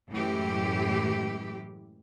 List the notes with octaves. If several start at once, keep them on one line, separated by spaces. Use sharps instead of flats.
F#2 A2 E3 G#3 G4